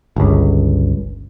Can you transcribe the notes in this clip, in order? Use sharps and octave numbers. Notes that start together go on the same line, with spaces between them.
G1 C#2